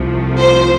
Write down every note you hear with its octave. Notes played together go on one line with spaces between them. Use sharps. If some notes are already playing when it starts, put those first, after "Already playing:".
Already playing: C2 C3 F3 A3
C5